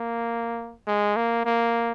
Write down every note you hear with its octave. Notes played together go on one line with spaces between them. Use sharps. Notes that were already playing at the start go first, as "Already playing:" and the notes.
Already playing: A#3
G#3
A#3
A#3